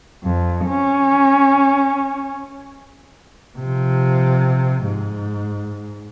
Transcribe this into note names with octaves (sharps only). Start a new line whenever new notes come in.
F2
C#4
C3 F3
G#2